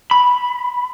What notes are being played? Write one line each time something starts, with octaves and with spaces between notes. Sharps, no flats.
B5